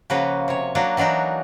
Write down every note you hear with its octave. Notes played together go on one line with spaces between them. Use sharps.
C#3 F3 A#3 F#4 B4
C3 C#5
F#3 A#3 D4 F#4
E3 F#3 D4 D#4 F#4